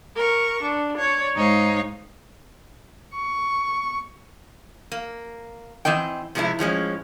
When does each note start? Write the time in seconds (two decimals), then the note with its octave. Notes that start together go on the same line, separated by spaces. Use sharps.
0.15 A#4 C#6
0.62 D4
0.96 C#5 D5
1.34 G#2 D#4 C#5 F5
3.14 C#6
4.92 A#3
5.85 E3 C4 D#5 G5
6.35 C3 F3 G#3 A3 E4
6.59 A2 F3 G#3 C#4